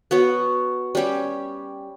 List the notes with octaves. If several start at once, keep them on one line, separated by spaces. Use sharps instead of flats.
B3 F#4 C#5
G3 C#4 G4